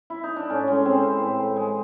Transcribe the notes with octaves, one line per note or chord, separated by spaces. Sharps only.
E4
D#4
D4
A2 C#4
G#3 C#4
G#3 C4
E3
A2
G#3
G#3